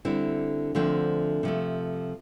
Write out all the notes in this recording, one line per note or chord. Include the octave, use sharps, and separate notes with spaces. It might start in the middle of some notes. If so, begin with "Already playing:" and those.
D3 G3 C4 E4
D2 D3 F3 A3 C4
C3 F3 A3